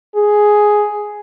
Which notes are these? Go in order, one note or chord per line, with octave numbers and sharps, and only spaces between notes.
G#4